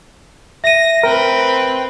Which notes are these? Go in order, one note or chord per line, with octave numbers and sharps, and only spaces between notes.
E5 A#6 D#7
C4 A#4 B4 G5